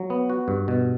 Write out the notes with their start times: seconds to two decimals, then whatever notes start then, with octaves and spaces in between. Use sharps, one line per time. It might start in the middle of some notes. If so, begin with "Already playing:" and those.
Already playing: F#3
0.10 B3
0.30 F#4
0.48 G2
0.68 B2